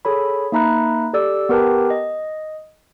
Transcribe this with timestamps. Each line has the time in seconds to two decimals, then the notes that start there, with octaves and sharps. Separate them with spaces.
0.05 G#4 A4 C#5 B5
0.52 A#3 D#4 E5 A#5 B5 F#6
1.13 G4 A4 D5 E6
1.49 B3 G4 A#4 B4 G5 A5
1.90 D#5